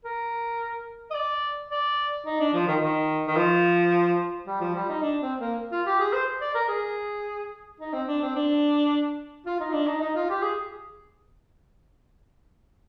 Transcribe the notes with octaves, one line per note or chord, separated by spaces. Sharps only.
A#4
D#5
D5
D5
D#4
D4
F3
D#3
D#3
D#3
F3
G3
F3
G3
D#4
D4
C4
A#3
F4
G4
G#4
C5
D5
A#4
G#4
D#4
C4
D4
C4
D4
F4
D#4
D4
D#4
D#4
F4
G4
G#4